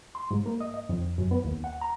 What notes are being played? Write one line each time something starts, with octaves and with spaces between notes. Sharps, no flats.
C6
G#2
A#3
D#5
D#5
F2
F#2
B3
D#2
F#5
A#5